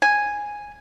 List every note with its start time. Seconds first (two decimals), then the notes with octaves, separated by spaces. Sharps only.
0.02 G#5